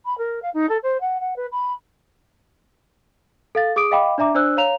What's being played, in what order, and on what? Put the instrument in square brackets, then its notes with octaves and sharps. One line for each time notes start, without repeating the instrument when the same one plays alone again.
[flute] B5
A#4
F5
D#4
A4
C5
F#5
F#5
B4
B5
[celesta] A4 F5 A6
G#4 D6 D#6 D7
D#5 F5 G5 B5 D6
D4 D5 E5 A#5 D6
D4 C5 D5 E6 F#6
C#5 F5 A#5 F7